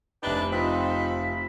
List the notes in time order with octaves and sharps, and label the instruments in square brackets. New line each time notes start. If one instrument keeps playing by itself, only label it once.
[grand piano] F1 E5 G7 [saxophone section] D4 D#4 G4 [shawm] B4
[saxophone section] C4 D#4 [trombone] F4 [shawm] B5